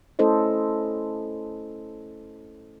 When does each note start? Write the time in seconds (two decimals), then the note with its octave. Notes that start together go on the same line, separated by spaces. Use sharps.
0.19 A3 C#4 E4 A4 C5 D#5